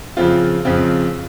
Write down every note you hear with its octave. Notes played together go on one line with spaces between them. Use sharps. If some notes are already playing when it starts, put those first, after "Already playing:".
F2 C#3 F3 C4 F4
F2 C#3 F3 C4 F4